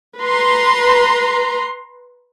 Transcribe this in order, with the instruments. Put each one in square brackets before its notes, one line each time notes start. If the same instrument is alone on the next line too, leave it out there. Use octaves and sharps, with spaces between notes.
[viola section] B4 A#5 C6